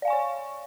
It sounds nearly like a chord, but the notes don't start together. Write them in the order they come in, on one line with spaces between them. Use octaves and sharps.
D5 F5 G#5 C#6 C#5